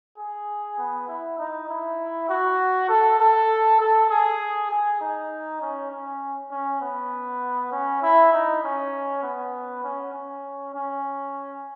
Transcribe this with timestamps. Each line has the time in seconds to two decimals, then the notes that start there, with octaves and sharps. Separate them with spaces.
0.17 G#4
0.78 B3
1.08 E4
1.38 D#4
1.69 E4
2.29 F#4
2.89 A4
3.20 A4
3.80 A4
4.10 G#4
4.71 G#4
5.01 D#4
5.61 C#4
5.91 C#4
6.51 C#4
6.81 B3
7.72 C#4
8.02 E4
8.33 D#4
8.63 C#4
9.23 B3
9.84 C#4
10.13 C#4
10.74 C#4